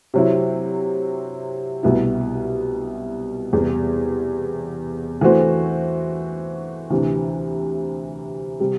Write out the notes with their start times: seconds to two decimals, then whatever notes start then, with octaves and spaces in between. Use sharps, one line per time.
0.14 C3 F#3 C4 E4
1.83 C2 B2 G3 B3 E4
3.53 E2 C3 G3 B3
5.21 E3 A3 C4 F#4 C5
6.90 D2 C3 E3
8.60 C3 G3